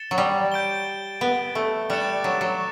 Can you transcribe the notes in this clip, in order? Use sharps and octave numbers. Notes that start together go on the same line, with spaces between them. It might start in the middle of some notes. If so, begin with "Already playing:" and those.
Already playing: A6 C#7 E7 G7
F#3
G3
G6 D7 G7
B3
A3
G3 D6 F#6 A6 C#7 E7
F#3
F#3